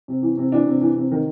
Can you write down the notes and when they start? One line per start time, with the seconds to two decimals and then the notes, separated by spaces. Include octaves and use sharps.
0.08 C3
0.22 E3
0.37 C3
0.52 E3 D4
0.66 C3
0.81 E3
0.96 C3
1.11 D#3